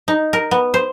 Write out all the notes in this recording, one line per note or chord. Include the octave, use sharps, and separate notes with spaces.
D#4
A#4
B3
C5